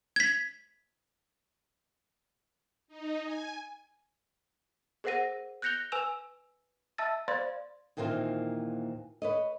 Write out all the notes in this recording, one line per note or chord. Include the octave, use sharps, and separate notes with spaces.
G#6 B6
D#4
G#5
G#4 A#4 C5 F#5 A#6 D#7
F#6 G6 A#6 C#7 F7 G7
B4 G#5 E6 E7 F7
E5 A5 E6 A6
C5 D5 F5 B5 C6 A6
D#2 A#2 E3 C4 F4 C5
B4 C#5 D#5